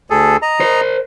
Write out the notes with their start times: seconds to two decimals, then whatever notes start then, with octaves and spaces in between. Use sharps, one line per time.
0.10 D2 G#4 A4
0.42 D#5 A#5
0.60 A#4 C5